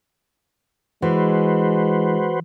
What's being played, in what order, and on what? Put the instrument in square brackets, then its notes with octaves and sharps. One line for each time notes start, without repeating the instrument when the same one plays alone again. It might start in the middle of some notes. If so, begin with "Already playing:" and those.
[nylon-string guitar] E3 [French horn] G#3 [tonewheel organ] F#4 B4 C5